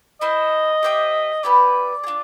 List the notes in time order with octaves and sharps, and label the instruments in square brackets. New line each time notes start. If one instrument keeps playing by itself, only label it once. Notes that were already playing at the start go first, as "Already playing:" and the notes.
[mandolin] E4 A4 C5 [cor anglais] D#5
[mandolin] G4 C5 E5 G5
[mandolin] B3 E4 G4 B4 [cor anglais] D5
[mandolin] G#4
D4 F4